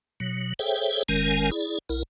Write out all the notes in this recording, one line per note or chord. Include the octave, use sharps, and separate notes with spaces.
B2 F#3
G#4 A4 C5 C#5 E5 G5
F#1 D#3 G#3 C#4 A#4 G#5
E4 G#4 D5
B1 E4 A#4